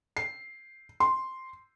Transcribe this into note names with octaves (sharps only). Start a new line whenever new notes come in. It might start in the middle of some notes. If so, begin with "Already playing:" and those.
C7
C6